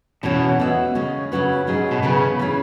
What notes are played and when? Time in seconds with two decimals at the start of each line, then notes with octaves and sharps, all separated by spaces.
0.23 E2 B2 E3 C#4 F#4
0.59 G#3 B3 F#4 E5
0.95 C#3 G#3 C#4
1.32 C#3 F#3 C#4 F#4 B4
1.67 G#2 F#3 C#4 G#4
1.91 B2
2.02 C#3 E3 B3 G#4 B4 E5
2.39 E3 C#4 G#4 E5